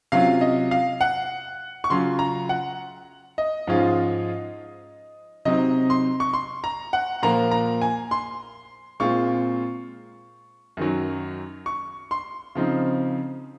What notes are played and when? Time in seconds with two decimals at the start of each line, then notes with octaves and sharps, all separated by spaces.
0.12 C3 F#3 C#4 F4 F5
0.41 D#5
0.71 F5
1.01 F#5
1.84 C#6
1.90 C#3 F#3 C#4 F4 C6
2.19 A#5
2.49 F#5
3.38 D#5
3.67 G#2 F3 G#3 C#4 F4
5.45 C3 F#3 C4 D#4 D#5
5.90 C6
6.20 C#6
6.33 C6
6.64 A#5
6.93 F#5
7.22 A#2 F3 A#3 A#5
7.51 A#5
7.82 G#5
8.11 C6
9.00 A#2 G#3 C4 F4 C#6
10.77 F#2 D#3 F#3
11.66 C#6
12.11 C6
12.55 C#3 F3 C4 D#4